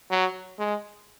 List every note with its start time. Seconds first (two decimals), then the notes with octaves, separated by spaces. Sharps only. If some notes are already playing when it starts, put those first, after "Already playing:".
0.10 F#3
0.59 G#3